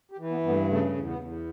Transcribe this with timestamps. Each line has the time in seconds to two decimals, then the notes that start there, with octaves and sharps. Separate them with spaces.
0.12 G4
0.18 E3
0.30 B3
0.43 G2 B3
0.49 A3
0.68 C#3 A3
0.93 E2
1.06 B3
1.18 E2